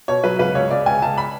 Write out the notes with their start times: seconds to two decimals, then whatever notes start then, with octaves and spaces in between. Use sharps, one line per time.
0.08 B2 C#5
0.24 F#3 B4
0.39 C#2 B4
0.55 C#2 C#5
0.70 C#2 D5
0.86 C#2 G#5
1.02 C#2 A5
1.18 B5